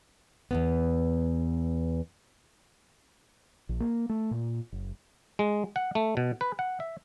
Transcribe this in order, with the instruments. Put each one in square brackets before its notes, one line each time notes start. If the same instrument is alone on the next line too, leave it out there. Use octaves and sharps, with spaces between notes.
[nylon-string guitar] E2 G#2 B3
[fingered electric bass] A#1
A#3
A3
A#2
F#1
[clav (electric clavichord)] G#3
F#5
A3
B2
B4
F#5
E5